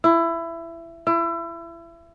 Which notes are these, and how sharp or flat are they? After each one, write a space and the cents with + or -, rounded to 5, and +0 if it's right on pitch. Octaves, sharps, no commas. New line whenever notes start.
E4 +20
E4 +30